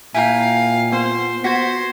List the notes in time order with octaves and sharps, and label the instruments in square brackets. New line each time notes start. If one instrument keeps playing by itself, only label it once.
[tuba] A#2 [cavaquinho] E4 G5 [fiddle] F5 [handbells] G#5 A#5
[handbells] B3 [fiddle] C5
[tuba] B3 [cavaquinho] F#4 [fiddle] C5 [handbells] G#6 B6